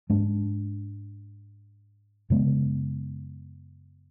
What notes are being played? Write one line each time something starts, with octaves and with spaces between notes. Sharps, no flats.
G#2 G#3 D4
F#2 C#3 G#3 B3